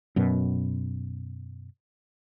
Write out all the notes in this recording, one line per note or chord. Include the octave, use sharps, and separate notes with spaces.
F#2 B2